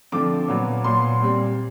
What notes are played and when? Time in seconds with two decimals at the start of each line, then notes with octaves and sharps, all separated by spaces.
0.12 D3 F3 A3 C4 D6
0.48 A#2 F#3 B3
0.84 A#2 F#3 B3 C6
1.21 A#2 G3 C4